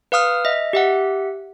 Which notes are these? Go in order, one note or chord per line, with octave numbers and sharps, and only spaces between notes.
B4 F5 D#6 F6
D#5 E5
G4 E5 F#5